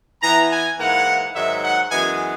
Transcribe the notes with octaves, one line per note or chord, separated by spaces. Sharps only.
E3 B3 E4 A#5
G#5
G#2 E3 A#3 E4 F#5
G#2 D#3 F#3 E5
F#5
F#2 E3 G#3 B3 G#5